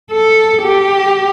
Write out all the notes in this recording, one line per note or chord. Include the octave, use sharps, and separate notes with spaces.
A4
G4